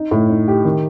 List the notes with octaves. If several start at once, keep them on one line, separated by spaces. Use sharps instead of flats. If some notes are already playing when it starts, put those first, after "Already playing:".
Already playing: D#4
A2
D#4
G4
D#3